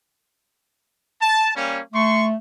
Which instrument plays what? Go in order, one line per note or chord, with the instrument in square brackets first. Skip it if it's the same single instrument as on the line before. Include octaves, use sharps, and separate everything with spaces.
[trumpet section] A5
G3 A#3 C#4
[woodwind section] A3 [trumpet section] C6 C#6